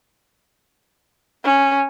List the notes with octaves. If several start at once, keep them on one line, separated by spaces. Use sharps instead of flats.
C#4